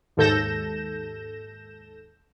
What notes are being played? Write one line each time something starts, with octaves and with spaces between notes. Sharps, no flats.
D#2 G#2 A4 G6 A#6 E7